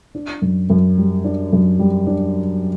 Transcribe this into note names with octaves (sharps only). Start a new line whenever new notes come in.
D4
F#2
F#2
G3
D4
F#2
G3
D4